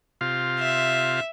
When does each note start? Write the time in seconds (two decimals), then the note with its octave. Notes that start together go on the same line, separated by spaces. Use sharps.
0.21 C3 F4 F5
0.60 E5